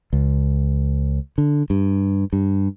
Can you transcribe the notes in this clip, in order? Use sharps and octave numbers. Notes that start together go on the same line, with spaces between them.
C#2
D3
G2
G2